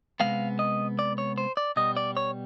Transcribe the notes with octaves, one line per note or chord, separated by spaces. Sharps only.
C3 F3 G#3 B3 F5
D#5
D5
C#5
C5
D5
B2 G3 B3 D#5
D5
C#5